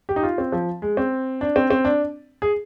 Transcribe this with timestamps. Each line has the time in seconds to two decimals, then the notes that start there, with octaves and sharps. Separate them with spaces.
0.09 G4
0.16 D#4
0.23 F4
0.38 C4
0.52 F3
0.82 G#3
0.97 C4
1.41 D4
1.56 C4
1.70 C4
1.85 D4
2.42 G#4